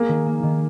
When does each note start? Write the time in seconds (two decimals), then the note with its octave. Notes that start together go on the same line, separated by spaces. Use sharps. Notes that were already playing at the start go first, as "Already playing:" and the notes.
Already playing: A#3 G#4
0.08 D#3
0.26 A#3
0.43 D#3